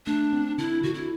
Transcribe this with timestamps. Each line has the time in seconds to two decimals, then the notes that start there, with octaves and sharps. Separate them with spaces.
0.06 A3 D4
0.33 C4
0.58 D3 E4
0.83 D3 F#4
0.94 E4